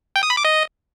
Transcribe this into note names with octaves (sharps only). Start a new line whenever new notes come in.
G5
D#6
B5
D6
D#5